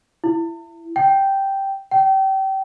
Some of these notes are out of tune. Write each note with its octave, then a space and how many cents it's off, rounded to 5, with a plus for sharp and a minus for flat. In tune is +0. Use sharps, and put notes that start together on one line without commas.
E4 +20
G5 -5
G5 -30